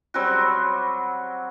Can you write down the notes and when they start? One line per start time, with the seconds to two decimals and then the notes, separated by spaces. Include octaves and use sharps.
0.14 F#3 G3 C4 F#4